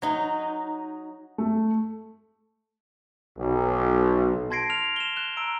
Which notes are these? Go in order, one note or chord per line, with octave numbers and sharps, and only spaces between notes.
F#3 D#4
A3
B1
A5 C6 G#6 A#6 C7 D7
F6 F7
E7 G7
F#6 G7
A#5 E6 D7